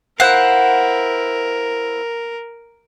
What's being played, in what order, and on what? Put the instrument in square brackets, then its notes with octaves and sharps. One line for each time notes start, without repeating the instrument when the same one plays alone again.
[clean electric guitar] E4 C5 F5 [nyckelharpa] A#4 [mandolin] F#5